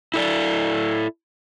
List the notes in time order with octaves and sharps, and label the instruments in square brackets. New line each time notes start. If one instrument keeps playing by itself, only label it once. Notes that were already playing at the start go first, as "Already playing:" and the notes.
[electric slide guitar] E4 A4 D5